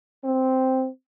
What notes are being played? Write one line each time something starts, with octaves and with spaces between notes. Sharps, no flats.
C4